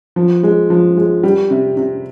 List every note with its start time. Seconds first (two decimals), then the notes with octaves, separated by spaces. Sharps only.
0.16 F3
0.43 G#3
0.70 F3
0.97 G#3
1.23 G3
1.51 C3
1.77 C3